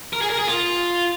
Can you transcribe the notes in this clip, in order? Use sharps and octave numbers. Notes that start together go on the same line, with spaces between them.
A#4
G#4
A#4
G#4
F4